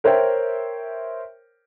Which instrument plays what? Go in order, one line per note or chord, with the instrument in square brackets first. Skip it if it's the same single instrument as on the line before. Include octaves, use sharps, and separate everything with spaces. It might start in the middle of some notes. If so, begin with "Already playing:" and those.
[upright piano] A#4 C5 C#5 E5 G5